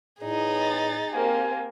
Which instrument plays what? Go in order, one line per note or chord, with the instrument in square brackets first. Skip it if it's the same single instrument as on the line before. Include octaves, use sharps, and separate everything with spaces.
[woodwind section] E2 A2 [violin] D#4 G#4
[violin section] A6
[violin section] A#3 C4 G4 [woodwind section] F5 G#5